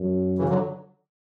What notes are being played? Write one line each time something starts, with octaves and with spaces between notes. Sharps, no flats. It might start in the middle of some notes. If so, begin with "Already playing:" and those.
Already playing: F#2
C#3 E3
D3 F#3